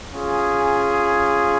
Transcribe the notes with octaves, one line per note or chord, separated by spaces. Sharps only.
C#4 F4 G#4